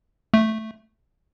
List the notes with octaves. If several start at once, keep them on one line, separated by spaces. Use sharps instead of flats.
A3